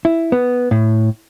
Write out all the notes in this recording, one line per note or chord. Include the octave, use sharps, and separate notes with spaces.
E4
B3
A2